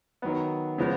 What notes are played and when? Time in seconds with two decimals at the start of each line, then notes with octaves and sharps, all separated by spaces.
0.22 D#3 F#3 B3
0.78 C#3 F3 G#3 B3